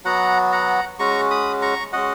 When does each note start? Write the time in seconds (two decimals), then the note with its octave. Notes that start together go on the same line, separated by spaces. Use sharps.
0.05 F#3 B3 F#4 F#5 A#5
0.52 F#5 A#5
0.99 G#3 C#4 F#4 A#5 C#6
1.30 B5 D#6
1.62 A#5 C#6
1.93 G#3 C#4 F#4 D#5 F#5